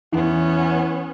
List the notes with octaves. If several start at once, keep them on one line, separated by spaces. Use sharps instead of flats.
E2 E3 B3 C#4